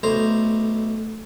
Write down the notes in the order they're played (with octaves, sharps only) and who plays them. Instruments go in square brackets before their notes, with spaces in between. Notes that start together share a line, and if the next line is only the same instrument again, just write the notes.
[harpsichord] B1 A3 C5 A#5